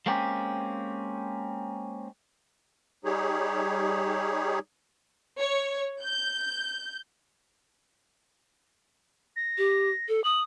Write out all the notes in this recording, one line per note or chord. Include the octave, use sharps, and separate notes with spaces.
G#3 A#3 C4 C#4 G4
G3 D#4 G4 G#4 C#5
C#5
G6
A#6
G4
A4
D#6 F#7